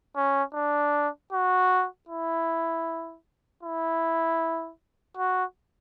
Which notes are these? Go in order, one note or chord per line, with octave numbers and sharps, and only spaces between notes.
C#4
D4
F#4
E4
E4
F#4